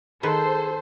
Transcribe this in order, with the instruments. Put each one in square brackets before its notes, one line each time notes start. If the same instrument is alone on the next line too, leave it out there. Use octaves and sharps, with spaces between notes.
[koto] D#3 B4 [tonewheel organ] G#4 [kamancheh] A4 [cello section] C5